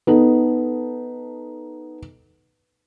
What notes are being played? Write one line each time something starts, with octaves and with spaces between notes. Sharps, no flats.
B3 D#4 A4